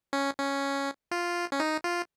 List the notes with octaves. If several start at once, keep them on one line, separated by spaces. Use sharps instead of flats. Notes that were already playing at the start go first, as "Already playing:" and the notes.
C#4
C#4
F4
C#4
D#4
F4